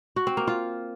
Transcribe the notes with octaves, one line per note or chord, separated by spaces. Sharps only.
F#4
C4
A#3
F4